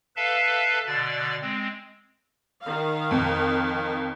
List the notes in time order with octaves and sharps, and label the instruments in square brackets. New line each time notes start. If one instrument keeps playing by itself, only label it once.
[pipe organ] A4 B4 E5 F5 A5
B2 D3 D5 A6
G#3 C4
[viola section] D#3 F5
[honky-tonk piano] F2